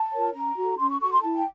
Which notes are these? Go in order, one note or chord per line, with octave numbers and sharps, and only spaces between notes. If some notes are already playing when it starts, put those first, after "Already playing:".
Already playing: A5
F4 A#4 C#5
C#4 A#5
F#4 A4
C#4 C6
C#6
F#4 A4 C#6
C6
E4 A5
G5